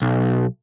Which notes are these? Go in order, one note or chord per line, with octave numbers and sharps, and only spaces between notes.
B1